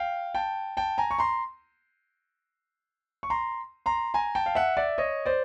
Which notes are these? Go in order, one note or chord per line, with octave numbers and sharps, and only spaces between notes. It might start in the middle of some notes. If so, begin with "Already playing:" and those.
Already playing: F5 G5
G5 A5
G5 A5
G#5 A#5
C#6
A#5 C6
C#6
A#5 C6
A#5 C6
G#5 A#5
G5 A5
F5
E5 F#5
D5 E5
C#5 D#5
C5 D5